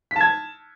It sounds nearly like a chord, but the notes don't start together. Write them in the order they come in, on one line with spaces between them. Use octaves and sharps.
B6 A5 G#6